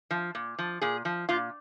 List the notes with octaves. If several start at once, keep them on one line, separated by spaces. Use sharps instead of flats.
F3
A#2
F3
A#2 G#4
F3
A#2 F4